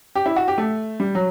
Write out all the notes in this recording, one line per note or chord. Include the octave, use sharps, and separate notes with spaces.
G4
E4
F#4
G4
A3
G3
F#3